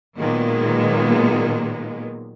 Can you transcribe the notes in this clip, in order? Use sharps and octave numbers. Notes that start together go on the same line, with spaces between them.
A#2 D#3 F#3 G#3 A#3 B3